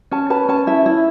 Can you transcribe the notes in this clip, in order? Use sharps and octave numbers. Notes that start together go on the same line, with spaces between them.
C#4 A5
B4 A5
C#4 A5
E4 E5
E4